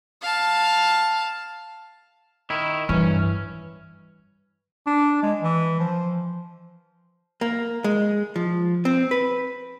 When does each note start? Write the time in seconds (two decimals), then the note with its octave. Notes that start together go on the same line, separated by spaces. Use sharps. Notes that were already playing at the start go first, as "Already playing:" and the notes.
0.22 F5 A5
2.50 D#3 E4
2.89 G2 E3 C#4
4.86 D4
5.23 G#3
5.41 E3
5.80 F3
7.41 A#3
7.84 G#3
8.36 F3
8.85 C4
9.11 B4